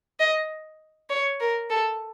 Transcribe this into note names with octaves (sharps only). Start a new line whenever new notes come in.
D#5
C#5
A#4
A4